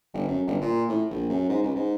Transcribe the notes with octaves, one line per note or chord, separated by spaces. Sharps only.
G1
F#2
G1
A#2
A2
A#1
F#2
G#2
C#2
G#2